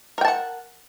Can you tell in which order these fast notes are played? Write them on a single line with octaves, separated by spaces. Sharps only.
A#4 G5 A5 F#5